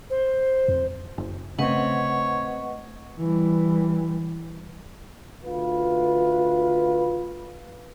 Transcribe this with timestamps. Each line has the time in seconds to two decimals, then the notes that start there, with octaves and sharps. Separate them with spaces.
0.10 C5
0.68 F2
1.18 F#1
1.59 C#3 A3 C4 B4 C#5 D#5 F#5
3.20 E3 G3
5.44 D2 F4 B4